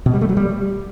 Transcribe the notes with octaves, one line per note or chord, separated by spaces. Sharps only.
B2
G3
A3
F#3
G3